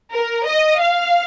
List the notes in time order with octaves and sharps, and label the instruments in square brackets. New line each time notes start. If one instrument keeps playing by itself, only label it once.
[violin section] A#4
D#5
F5